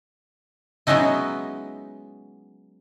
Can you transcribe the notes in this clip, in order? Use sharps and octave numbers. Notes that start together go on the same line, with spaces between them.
F#3 G#3 B3 C#4 D#4 E4